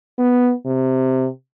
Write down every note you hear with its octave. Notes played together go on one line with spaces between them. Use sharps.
B3
C3